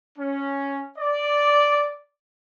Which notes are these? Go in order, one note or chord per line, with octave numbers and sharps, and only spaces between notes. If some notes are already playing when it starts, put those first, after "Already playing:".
C#4
D5